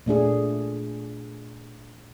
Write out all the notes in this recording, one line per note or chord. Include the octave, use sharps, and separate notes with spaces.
A#2 A3 D4 G#4